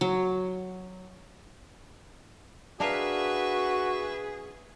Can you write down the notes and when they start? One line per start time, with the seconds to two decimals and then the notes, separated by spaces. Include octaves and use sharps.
0.01 F#3
2.80 D4 F#4 G#4 A#4 B4 E5 F5